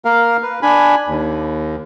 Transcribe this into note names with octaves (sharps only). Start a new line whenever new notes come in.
A#3 A#4 F5
B4
D4 G#5 B5
D#2